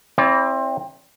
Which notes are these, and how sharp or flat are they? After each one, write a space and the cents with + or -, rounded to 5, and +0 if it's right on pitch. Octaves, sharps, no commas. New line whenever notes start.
C4 +25 E4 +0 D5 -25